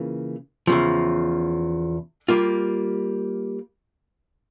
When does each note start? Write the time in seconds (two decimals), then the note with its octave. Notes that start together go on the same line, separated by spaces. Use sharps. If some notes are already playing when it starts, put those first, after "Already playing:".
Already playing: C#3 E3 A#3 F4
0.67 E2 C#3 F3
2.28 G3 A#3 F4